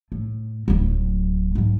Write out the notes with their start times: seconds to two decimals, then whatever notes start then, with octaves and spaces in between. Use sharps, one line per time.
0.12 A2
0.68 D1 F#3
1.55 G#2 F#3